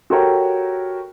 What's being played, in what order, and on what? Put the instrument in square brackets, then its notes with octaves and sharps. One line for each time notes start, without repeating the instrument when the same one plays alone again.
[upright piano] F#4 G4 A4 A#4 C#5 G5